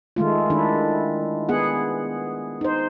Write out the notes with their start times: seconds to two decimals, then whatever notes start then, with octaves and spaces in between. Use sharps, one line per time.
0.16 D#3 G#3 A3 F4
0.50 D#3 D4 E4
1.49 B3 G#4 F#5
2.61 D#4 C5